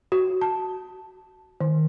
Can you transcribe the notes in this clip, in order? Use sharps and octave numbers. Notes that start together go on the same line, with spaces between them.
F#4
A5
D#3